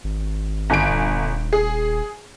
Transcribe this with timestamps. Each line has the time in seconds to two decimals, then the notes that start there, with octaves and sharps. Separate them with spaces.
0.04 G#1
0.70 G1 G#5 D7
0.89 D#1
1.53 G#4